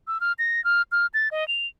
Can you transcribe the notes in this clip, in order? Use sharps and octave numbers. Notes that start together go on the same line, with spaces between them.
E6
F6
A#6
F6
F6
A6
D#5
F7